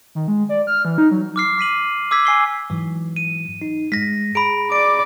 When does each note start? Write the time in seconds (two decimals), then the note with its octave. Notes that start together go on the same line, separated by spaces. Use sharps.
0.15 D#3
0.28 G#3
0.49 D5
0.67 F6
0.85 E3
0.98 D#4
1.11 F#3
1.36 D6 F6 C7
1.58 D6 B6 D#7 F#7
2.11 D6 E6 G#6 B6
2.25 G#5 C7 G7
2.70 G#2 E3 F#3
3.16 D#7
3.62 D#4
3.92 G#2 G#3 A#6 B6
4.35 G#4 A#5 B5 D7
4.72 D5 D6 D7